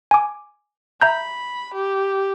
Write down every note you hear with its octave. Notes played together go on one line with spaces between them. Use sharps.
G#5 D6
E5 A#5 B5 G6
G4